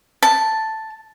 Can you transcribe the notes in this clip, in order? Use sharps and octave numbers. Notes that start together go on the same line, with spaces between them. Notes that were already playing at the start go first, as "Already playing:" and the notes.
A5